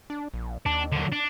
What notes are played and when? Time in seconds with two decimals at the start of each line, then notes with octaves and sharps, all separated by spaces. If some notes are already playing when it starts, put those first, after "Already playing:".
0.10 D4
0.34 A#1
0.66 D#2 D4
0.92 D3 F#3
1.12 D4